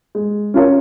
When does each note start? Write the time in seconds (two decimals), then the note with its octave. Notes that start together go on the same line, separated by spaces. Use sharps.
0.15 G#3
0.54 C#4 F4 A#4 C#5